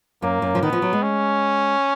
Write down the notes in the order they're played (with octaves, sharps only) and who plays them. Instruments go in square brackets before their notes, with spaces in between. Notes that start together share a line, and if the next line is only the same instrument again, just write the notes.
[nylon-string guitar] F#2 [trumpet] A#3
[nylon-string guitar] F#2
F3
[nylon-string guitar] D#3 [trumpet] B3
[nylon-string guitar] F3
F#3
G#3
[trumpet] C#4